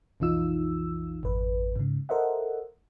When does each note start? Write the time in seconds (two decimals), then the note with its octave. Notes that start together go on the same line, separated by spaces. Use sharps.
0.20 B1 F2 E3 D#4 F4 E6
1.23 G#1 F2 B4
1.76 G#2 C#3
2.09 A4 A#4 C5 D#5 E5 F#5